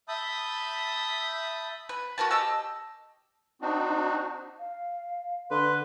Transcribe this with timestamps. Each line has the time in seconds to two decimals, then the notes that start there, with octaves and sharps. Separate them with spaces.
0.08 E5 A5 B5 D#6 G6
1.89 B4
2.18 F#4 A#4 B4 A5
2.31 G4 D#5 A5 E6
3.62 C4 D4 D#4 F#4
4.59 F5
5.51 D3 B4 C6